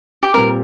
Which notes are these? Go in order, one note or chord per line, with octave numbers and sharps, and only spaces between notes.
G4
A#2 G3 C4 G4 A#4